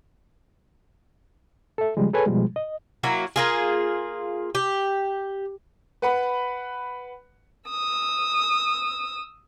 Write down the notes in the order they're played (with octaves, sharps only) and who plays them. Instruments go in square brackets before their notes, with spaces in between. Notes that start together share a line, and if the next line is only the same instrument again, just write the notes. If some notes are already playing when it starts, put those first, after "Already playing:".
[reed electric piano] A4 E5
C#3 F3 G3 G#3
G#4 A4 B4 C#5 G#5
B2 F3 G3 G#3
D#5
[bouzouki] F#3 A#3 E4
A#3 F4 G#4
G4
[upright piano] B4 F#5 B5
[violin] D#6 E6